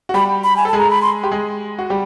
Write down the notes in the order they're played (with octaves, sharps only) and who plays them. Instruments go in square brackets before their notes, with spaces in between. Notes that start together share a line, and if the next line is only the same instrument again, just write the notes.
[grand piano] F#4
[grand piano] G3 G4 [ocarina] B5
[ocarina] B5
G#5
[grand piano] A4 [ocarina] A5
[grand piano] G#3 G#4
[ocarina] A#5
B5
C6
[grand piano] G4
G#3 G#4
F#4
G3 G4